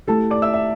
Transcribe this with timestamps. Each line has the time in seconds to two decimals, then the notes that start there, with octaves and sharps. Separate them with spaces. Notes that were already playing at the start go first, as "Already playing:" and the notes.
0.07 A3 E4 G4 A4 A5
0.30 D5 D6
0.42 E5 E6
0.54 E5